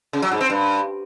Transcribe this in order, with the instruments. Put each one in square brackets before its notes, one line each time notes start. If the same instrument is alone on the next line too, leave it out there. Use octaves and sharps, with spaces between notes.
[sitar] C#3
F#3
G#2
C4
G2